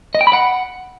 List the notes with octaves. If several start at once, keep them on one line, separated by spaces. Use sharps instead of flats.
D#5
G5
B5
F#5